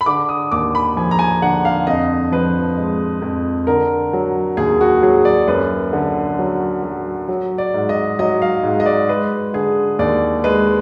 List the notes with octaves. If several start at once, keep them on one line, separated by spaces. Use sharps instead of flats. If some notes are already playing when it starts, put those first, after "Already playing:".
B5
D3 D6
D#6
D#2 D6
B5
F3 G#5
A#5
G#5
D3 F#5
F5
F2 D#5
F3 B4
G#3
F2
D3 A#4
F#3
D#2 G#4
F#4
F#3 G#4
D5
F#2 B4
D3
F#3
F#3
F#3
D5
G#2
D#5
F#3 D#5
F5
G#2
D#5
D5
G#3 B4
D3 G#4
D#2 D5
G#3 B4